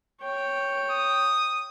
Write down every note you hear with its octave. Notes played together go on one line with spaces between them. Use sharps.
C#5 G5
D#6